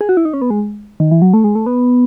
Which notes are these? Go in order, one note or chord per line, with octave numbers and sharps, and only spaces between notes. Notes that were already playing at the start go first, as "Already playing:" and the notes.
G#4
F#4
E4
D#4
C#4
B3
G#3
D#3
E3
F#3
A3
G#3
A3
B3